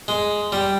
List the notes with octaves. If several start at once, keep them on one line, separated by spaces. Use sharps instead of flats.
G#3
G3